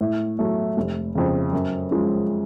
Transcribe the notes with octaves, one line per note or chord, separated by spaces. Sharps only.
A2
F#3 A3
F1
F2 C#3
F#2
F3 G#3 C#4